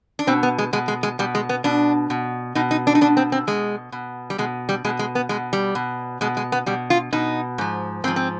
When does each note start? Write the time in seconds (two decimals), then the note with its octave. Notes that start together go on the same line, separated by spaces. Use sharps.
0.19 D4
0.27 B2 C4
0.43 B3
0.58 G#3
0.73 B2 G#3
0.88 G#3
1.03 G#3
1.19 B2 G3
1.35 G#3
1.49 B3
1.64 B2 D4
2.10 B2
2.55 B2 D#4
2.71 D#4
2.87 D4
2.95 D#4
3.01 B2 D4
3.17 C4
3.32 C4
3.47 B2 G#3
3.92 B2
4.30 G3
4.38 B2 G#3
4.69 G3
4.85 B2 G#3
4.99 G#3
5.15 B3
5.29 B2 G#3
5.53 G3
5.75 B2
6.21 B2 G#3
6.37 G#3
6.52 B3
6.66 B2 G3
6.90 F4
7.13 B2 D#4
7.58 G#2 F3
8.04 G#2 C4
8.08 F3
8.16 C4